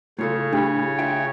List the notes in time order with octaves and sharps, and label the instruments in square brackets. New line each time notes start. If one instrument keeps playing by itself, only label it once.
[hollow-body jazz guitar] A2 F4 A4 [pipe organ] C#3 C#5
[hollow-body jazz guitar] A2 B5 [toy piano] D4 G4
[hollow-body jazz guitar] F4 E5 G5